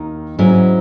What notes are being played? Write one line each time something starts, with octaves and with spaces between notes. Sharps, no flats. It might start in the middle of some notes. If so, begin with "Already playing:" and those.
Already playing: D#2 D#3
G#2 F#3 C#4 E4